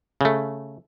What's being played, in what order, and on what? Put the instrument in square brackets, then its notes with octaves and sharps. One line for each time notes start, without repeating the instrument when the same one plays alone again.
[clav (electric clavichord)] C#3 A3